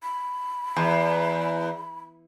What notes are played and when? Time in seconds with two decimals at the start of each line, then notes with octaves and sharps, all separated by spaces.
0.03 B5
0.76 E2